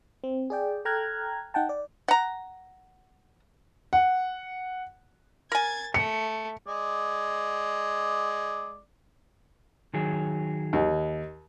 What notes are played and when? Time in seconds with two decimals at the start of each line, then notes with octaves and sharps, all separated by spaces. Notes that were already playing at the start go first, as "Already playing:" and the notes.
0.24 C4
0.50 G#4 D5 G5
0.85 A4 G5 A#5 F6 F#6 G#6
1.54 D#4 F#5 G5 A5
1.69 D5
2.08 F#5 A#5
3.93 F#5
5.52 A#4 G#5 G#6 A6
5.94 A3 C#7
6.67 G#3 D5
9.94 D#3 F#3 G#4
10.73 D#2